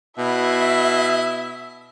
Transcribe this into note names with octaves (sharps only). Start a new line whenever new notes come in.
B2 E4 E5